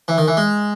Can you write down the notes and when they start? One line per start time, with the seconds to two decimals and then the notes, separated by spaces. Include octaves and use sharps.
0.08 E3
0.18 D#3
0.28 E3
0.37 G#3